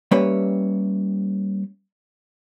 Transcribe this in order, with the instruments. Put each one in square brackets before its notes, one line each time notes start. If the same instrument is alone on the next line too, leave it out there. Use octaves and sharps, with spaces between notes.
[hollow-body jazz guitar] G3 A#3 C#4 B4 C#5 E5